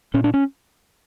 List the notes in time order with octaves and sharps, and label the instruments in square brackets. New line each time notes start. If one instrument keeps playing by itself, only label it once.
[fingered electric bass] A#2 C#4
D4
C#4